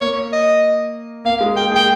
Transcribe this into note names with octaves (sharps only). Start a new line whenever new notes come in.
A#3 C#5
D#5
A#3 F5
G#3
A#3 G5
G#4 G5